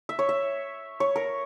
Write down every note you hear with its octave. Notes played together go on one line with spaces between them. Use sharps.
E5
C#5
E5
C#5
A#4